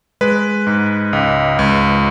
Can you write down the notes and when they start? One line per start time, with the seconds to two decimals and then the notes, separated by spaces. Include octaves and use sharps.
0.21 G#3 B4
0.67 G#2
1.13 C#2
1.59 C#2